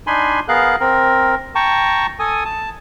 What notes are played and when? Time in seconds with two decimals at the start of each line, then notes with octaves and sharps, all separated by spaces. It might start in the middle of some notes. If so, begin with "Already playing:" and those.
0.07 D4 D#4 G#5 B5 C6
0.48 B3 G#4 A#4 F5 F#6
0.80 C4 A#4
1.55 G5 A5 A#5 C#6
2.20 A4 G#5 D#6
2.45 A5